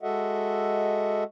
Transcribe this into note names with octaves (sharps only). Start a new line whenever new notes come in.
G#3 F#4 A4 D#5 E5 F#5